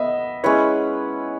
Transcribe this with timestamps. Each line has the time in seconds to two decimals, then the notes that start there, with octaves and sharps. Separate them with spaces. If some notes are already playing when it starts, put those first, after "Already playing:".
Already playing: B3 D#5 E5
0.44 G#3 C#4 E4 B4 C#5